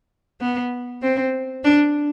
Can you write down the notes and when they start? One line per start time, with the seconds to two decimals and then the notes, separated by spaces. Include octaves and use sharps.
0.40 B3
1.02 C4
1.64 D4